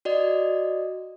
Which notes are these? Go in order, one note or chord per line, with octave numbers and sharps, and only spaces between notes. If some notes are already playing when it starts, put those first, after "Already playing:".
F#4 D5 D#5